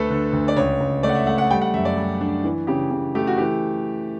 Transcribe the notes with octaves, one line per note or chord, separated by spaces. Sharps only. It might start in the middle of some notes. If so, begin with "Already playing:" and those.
Already playing: D2 A3 A4 B4
D3
D2
D5
C#2 C#5
C#2
A3 D5
F#5
E5
A3 F#5
F#5
G3 G5
F#5
F#2 E5
D5
G3
D4
E3
C#3 G4
C#3
A3 G4
F#4
E3 G4